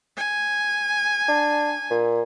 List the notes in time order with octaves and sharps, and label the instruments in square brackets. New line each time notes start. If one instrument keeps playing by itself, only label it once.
[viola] G#5
[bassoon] D4
A#2